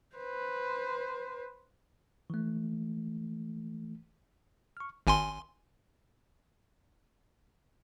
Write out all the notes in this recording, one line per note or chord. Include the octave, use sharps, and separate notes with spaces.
B4 C5
E3 A3
C#6 F6
G#1 G#5 C6